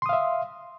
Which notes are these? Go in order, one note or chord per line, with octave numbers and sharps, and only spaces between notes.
E5 F5 C6 D#6